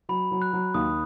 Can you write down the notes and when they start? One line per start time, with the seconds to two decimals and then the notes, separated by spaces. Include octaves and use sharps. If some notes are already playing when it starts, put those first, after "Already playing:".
0.09 F#3 B5
0.31 F#3
0.42 F#6
0.53 F#3
0.74 D#2 D#6